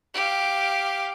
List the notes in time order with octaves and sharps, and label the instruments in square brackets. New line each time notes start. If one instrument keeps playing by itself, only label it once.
[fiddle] G4 F5